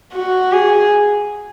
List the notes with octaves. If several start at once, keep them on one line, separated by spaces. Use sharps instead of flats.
F#4
G#4